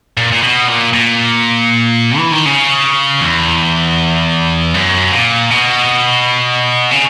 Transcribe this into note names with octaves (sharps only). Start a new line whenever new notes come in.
A#2
A#2
B2
A#2
A#2
E3
D#3
C#3
E2
F#2
A#2
B2
C#3